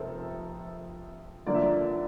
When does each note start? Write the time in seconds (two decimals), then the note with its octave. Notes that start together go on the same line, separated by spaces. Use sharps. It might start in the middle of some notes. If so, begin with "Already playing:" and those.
Already playing: F1 F2 C3 A4 A#4 C5
1.46 G2 D3 F3 A#3 D4 D5
1.55 E5
1.62 A#4 D5